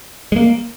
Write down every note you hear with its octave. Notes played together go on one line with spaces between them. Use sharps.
G#3
A#3